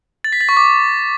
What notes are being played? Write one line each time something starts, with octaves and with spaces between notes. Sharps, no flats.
A6
B6
A6
C#6
D6